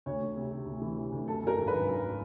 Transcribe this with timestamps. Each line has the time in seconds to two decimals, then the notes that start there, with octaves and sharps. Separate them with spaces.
0.06 D2 C#5
0.21 D2
0.36 C3
0.52 C3
0.66 D2
0.82 E3
0.98 C3
1.12 D2
1.27 F#2 A4
1.43 F#2 A#4
1.57 G#1
1.67 B4
1.73 G#1
1.88 F#2